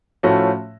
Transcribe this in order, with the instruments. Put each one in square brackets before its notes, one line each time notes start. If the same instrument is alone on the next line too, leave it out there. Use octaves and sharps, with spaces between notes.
[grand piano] A2 F3 A3 C#4 F#4